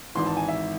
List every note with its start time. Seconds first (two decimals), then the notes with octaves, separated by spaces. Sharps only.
0.15 G#1 G#2 E3 C6
0.26 A5
0.37 G#5
0.48 E5